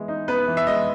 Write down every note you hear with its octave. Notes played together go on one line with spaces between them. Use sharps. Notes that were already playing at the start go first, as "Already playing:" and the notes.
Already playing: E3 G#3 B3
D#4
B3 B4
E3
E5
G#3 D#5